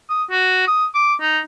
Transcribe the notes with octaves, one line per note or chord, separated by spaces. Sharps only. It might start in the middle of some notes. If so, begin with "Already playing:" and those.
D#6
F#4
D#6
D6
D#4